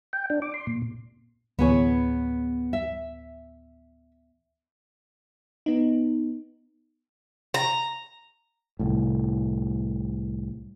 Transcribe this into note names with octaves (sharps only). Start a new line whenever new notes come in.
G5
D4
D6
C6
A#2
D2 A2 E3 B3 G#4 C#5
E5
B3 D#4
A#5
C2 A2